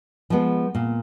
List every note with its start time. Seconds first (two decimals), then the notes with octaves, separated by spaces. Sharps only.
0.30 F3 G#3 B3
0.75 A#2